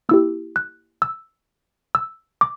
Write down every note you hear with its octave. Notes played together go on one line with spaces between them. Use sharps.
A#3 E4 G4 E6
F#6
E6
E6
D6